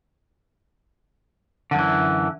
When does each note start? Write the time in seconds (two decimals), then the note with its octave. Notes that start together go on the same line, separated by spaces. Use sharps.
1.71 D3
1.75 F#2
1.79 E3